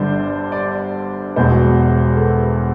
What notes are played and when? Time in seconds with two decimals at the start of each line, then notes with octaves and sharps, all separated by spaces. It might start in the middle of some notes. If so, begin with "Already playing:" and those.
Already playing: G1 G2 D3 C5 D5
0.52 D5
1.36 E1 E2 B2 C5
2.16 A4
2.21 B4